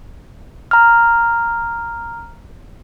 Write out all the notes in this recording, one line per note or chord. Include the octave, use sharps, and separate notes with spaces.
A#5 F6